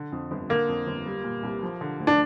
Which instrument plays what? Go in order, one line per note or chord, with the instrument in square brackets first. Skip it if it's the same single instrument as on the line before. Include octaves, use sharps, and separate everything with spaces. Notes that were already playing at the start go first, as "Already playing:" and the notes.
Already playing: [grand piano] D3
F2
G1
[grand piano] D3 [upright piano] A#3
[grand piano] F2
G1
G3
A#2
C2
F3
D3
D2
[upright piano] D4